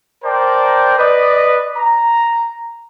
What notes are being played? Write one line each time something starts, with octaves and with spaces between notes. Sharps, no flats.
A#4 C5 D5 G5 A5 A#5
B4 D5 D#5
A#5